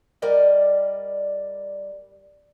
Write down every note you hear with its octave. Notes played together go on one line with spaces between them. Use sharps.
G3 A#4 D5 D#5